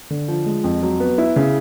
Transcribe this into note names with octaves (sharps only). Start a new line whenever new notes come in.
D3
F3
G#3
F2
F#3
B3
E4
C#3